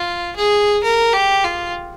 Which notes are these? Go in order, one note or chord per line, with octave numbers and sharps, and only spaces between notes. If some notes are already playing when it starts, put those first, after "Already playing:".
Already playing: F4
G#4
A#4
G4
F4